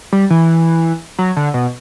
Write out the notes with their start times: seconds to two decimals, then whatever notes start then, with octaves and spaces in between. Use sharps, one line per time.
0.12 G3
0.30 E3
1.19 F#3
1.37 D3
1.54 B2